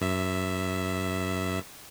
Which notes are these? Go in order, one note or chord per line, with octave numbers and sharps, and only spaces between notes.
F#2 E5